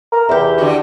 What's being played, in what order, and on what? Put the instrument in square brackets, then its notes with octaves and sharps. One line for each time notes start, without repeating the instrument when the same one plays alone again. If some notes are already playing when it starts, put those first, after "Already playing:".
[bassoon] A#4
[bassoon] E2 [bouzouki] E4 G4
[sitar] D3 F#4